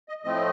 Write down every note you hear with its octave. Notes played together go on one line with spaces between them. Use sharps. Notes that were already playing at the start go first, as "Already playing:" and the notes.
D#5
A2 F3 A3 C4 D#5